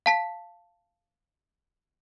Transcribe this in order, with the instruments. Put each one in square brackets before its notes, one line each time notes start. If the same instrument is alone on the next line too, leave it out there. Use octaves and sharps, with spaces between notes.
[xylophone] F5 A5 B6